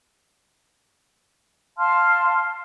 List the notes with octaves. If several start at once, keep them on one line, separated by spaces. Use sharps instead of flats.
F5 A5 C6 F6